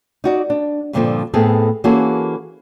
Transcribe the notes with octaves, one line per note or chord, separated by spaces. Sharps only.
D#4 F#4 D5
D4
G2 A#2 D3 E3 F3 C4
A2 B3 C4 G#4 A4
E3 A#3 C#4 F#4 G#4 A4